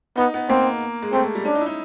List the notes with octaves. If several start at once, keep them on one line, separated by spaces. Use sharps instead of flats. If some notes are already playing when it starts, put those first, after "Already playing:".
B3 D#4
B3
A#3 C4
G#3
A3 C4
G#3
G3
C#4 D4
D#4
E4
D#4